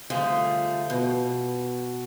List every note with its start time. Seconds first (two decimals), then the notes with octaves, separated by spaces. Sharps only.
0.10 D3 F3 G3 A3 F4 G#4
0.90 B2